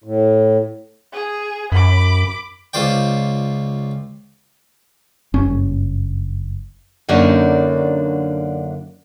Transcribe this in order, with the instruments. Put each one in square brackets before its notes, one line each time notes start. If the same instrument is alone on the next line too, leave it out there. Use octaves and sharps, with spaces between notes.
[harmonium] A2
[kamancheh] G#4
[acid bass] F#2 [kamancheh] B5 D6
[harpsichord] C#2 F4 C5 D5 G5
[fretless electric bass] F#1 G2 C#4
[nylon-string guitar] F#2 D3 A#3 D4 D#4 C#5